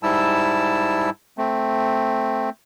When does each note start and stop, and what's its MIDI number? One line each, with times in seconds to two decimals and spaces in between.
0.03 1.10 44
0.03 1.10 55
0.03 1.10 64
0.03 1.10 81
0.03 1.10 88
1.38 2.50 57
1.38 2.50 60